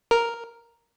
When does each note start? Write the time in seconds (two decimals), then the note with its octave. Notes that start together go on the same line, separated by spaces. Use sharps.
0.11 A#4